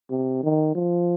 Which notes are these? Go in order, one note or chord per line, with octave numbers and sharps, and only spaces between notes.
C3
D#3
F3